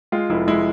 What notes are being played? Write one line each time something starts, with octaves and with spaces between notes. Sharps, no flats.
G#3 F4
F1 E4
G#3 E4